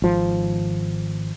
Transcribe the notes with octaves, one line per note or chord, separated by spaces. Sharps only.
G#1 F3